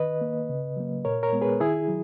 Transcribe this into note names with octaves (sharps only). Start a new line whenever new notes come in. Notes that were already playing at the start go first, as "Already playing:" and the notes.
Already playing: D#3 B4 D#5
A#3
C#3
F#3 A#3
A#2 A#4 C#5
A#4 C#5
G#3 B3
G#4 B4
D#3 E4 G#4
F#3